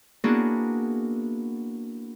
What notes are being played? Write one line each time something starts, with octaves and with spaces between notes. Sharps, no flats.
A#3 B3 D4 E4 F#4 G#4